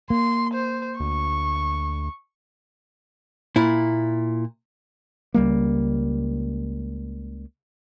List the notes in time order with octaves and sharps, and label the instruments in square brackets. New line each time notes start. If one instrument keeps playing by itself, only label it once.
[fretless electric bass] A#3 [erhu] C6
[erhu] C5
[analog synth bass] D2 [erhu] C#6
[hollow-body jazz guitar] A#2 E4
[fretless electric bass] C#2 G3 A#3